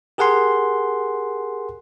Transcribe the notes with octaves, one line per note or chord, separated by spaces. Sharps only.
G4 G#4 A#4 F#5 G#5 C6